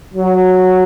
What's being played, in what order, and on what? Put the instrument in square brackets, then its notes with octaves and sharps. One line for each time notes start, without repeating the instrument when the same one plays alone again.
[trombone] F#3